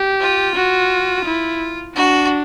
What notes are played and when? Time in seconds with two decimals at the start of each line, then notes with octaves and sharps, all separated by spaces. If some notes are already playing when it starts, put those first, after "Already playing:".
Already playing: G4
0.21 F4
0.55 F#4
1.25 E4
1.95 D4 F#4